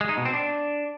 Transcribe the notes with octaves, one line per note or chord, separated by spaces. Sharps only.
G#3
D#4
B2
C4
D4